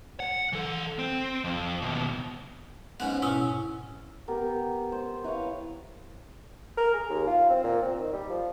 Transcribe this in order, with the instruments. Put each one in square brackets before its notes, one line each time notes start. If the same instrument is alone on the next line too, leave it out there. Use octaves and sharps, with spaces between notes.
[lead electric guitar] F#5
E3 A4
C4
F2
D#2 B2
[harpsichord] G#2 C#3 B3 [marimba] F#5
[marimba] G#2 B2 E4 [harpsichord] C#4
[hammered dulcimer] B3 G4 A#4
C5
E4 B4 C#5 F5
[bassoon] A#4
G#4
D#2
F4
C4
A#2
C4
D#3
G3
F3